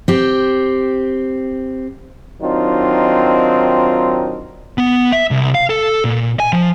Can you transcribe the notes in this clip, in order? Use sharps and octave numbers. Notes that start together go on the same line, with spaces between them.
C4 G4
D#3 F#3 C4 D4 D#4 F4
B3
E5
C2
F5
A4
A#2
G#5
F3